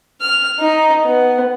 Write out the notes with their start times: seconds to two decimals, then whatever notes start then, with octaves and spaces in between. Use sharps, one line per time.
0.21 F6
0.60 D#4
1.05 B3